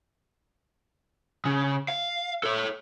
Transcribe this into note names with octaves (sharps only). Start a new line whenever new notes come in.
C#3
F5
A4 C#5